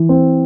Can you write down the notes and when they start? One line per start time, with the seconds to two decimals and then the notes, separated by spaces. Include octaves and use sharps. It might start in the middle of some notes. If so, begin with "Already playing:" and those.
Already playing: E3
0.09 C4